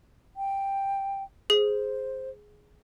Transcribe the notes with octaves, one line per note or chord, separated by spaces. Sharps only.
G5
G#4 C5